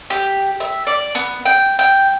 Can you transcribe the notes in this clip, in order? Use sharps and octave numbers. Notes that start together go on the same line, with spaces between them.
G4
E5
D5
B3
G5
G5